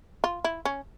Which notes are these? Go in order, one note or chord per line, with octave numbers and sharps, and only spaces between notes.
F4
E4
C#4